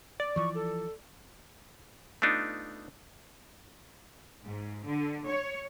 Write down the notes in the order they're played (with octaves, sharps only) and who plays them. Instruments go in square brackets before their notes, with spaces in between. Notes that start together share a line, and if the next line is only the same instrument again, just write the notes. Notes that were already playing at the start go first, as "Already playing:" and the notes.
[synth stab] D5
[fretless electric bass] E3 F3 [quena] C#6
[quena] A4
[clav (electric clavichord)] A3 B3 D4 D#4 F4
[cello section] G#2
D3
C#5